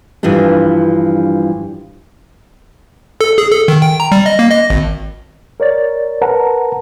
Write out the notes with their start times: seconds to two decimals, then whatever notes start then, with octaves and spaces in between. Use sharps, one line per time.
0.23 G2 E3 F3 G3 D4
3.21 A4
3.38 G#4
3.52 A4
3.68 D#3
3.82 G5
4.00 A#5
4.12 G3
4.26 D#5
4.39 A#3
4.51 D#5
4.70 G#1
5.60 A#4 C#5 D5 A6
6.21 A#4 B4 F#5 A5 A#5